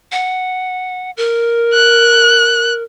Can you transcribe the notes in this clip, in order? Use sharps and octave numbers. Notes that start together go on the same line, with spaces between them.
F#5
A#4
F#6